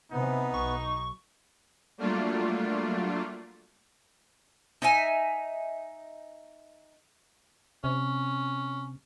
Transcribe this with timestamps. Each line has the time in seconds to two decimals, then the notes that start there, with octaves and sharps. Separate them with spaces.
0.12 C3 E3 B3 D#4
0.54 B1 C#6
1.98 F#3 G3 A3 A#3 D4 F4
4.82 D#4 E5 G#5
7.84 C3 C#4